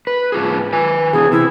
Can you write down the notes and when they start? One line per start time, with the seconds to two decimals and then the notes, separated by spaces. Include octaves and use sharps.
0.07 B4
0.32 G#2 F4 G#4
0.73 B4 G#5
1.13 E2 B2 E3 G#4
1.32 C3 E4